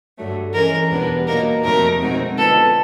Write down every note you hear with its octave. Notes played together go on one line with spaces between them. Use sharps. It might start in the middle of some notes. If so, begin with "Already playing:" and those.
G2 D3 F#3 A3
E3 G#3 C#4 A#4
E2 B2 G3 B3 D4
A#2 F#3 A#3 D#4 A#4
F2 C3 D#3 F#3 A3 A#4
B2 G#3 C4 D#4 F#4
D3 F3 G#3 B3 A4